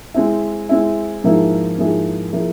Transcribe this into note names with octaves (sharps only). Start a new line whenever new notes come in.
G#3 C4 E4
G#3 C4 E4
G#2 F3 A#3 E4 G#4
G#2 F3 A#3 E4 G#4
F3 A#3 E4 G#4